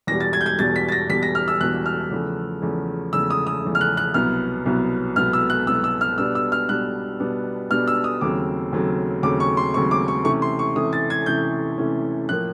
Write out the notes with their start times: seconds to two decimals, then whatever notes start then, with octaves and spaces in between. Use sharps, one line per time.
0.07 E2 B2 G3 A#6
0.20 A6
0.33 G#6
0.41 G6
0.46 G#6
0.58 E2 B2 G3 A6
0.76 B6
0.89 A6
0.92 A#6
1.09 E2 B2 G3 B6
1.23 A#6
1.35 F6
1.48 E6
1.61 E2 B2 G3 F#6
1.86 F6
2.11 E2 C#3 F3 A3
2.62 E2 C#3 F3 A3
3.13 E2 C#3 F3 A3 E6
3.30 D#6
3.47 D#6
3.64 E2 C#3 F3 A3
3.75 F6
3.81 F#6
3.97 F#6
4.14 C2 B2 F#3 B3 F6
4.66 C2 B2 F#3 B3
5.16 C2 B2 F#3 B3 F6
5.33 E6
5.50 F#6
5.67 C2 B2 F#3 B3 E6
5.84 E6
6.01 F6
6.18 B2 G3 B3 D4 E6
6.35 E6
6.52 F6
6.69 B2 G3 B3 D4 F#6
7.20 B2 G3 B3 D4
7.71 B2 G3 B3 D4 F6
7.88 E6
8.04 D#6
8.21 D#2 C#3 F#3 A3 C4 D6
8.72 D#2 C#3 F#3 A3 C4
9.23 D#2 C#3 F#3 A3 C4 D6
9.40 C#6
9.57 C6
9.74 D#2 C#3 F#3 A3 C4 C#6
9.91 D6
10.08 C#6
10.25 C3 E3 A3 C#4 C#6
10.42 C6
10.59 C#6
10.76 C3 E3 A3 C#4 D#6
10.93 A6
11.10 G#6
11.26 C3 E3 A3 C#4 G6
11.78 C3 E3 A3 C#4
12.29 A2 F3 A#3 F#6